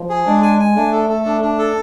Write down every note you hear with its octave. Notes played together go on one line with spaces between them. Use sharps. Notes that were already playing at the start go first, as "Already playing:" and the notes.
Already playing: F3
G#4
G#3 D4
G#5
G#5
A3 D4
A4
A4
D4
D4
A4